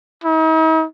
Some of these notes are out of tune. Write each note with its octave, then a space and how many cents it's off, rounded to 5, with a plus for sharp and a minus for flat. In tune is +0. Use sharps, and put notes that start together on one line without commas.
D#4 +45